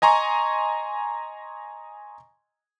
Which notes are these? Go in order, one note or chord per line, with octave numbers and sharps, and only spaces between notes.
D#5 G#5 A#5 C6 C#6